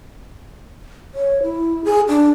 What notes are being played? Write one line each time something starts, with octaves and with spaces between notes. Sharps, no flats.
C#5
E4
G#4
D4